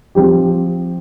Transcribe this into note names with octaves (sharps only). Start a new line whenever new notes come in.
F3 C4 G4